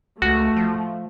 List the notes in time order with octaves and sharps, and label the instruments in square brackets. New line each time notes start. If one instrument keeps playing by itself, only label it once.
[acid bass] C#2 [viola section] A3 [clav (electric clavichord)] F#4
[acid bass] F3